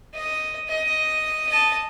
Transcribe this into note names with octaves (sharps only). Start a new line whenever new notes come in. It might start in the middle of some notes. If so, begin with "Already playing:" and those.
D#5
D#5
D#5 A5